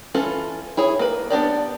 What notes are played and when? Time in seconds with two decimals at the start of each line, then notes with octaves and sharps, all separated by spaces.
0.14 E3 C#4 F4 A4 B4
0.77 E4 G#4 C#5
0.99 A#3 B4
1.30 B3 D4 G4 D5